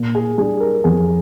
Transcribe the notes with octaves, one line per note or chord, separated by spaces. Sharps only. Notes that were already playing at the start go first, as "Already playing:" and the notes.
Already playing: A#2
G#4
G3 D4 G#4
A#4
F2 G#4